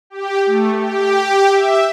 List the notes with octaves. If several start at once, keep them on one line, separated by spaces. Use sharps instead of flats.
G4
A3
G4
E5